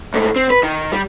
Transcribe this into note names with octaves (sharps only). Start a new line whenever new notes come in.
G#2 A3
C4
B4
D#3
G3